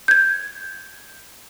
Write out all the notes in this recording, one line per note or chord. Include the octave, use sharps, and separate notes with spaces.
G6 G#6